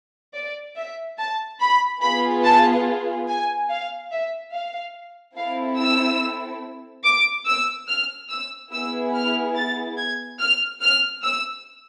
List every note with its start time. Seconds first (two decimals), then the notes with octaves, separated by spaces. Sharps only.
0.35 D5
0.77 E5
1.19 A5
1.60 B5
2.02 B3 F4 G#4 B5
2.45 A5
3.29 G#5
3.70 F5
4.12 E5
4.54 F5
5.37 C4 E4 A4 F5
5.79 E6
7.05 D6
7.47 E6
7.88 F6
8.30 E6
8.73 B3 E4 G#4 E6
9.15 F6
9.56 A6
9.98 G#6
10.40 F6
10.81 F6
11.24 E6